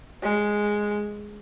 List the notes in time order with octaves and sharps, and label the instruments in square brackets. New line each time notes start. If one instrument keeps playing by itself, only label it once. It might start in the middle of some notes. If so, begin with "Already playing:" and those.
[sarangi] G#3